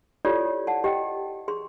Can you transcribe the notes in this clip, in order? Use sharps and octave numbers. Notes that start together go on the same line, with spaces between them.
E4 F4 G4 A4 C#5 D5
F#5 A5
G4 D#5 G5
G#4 C6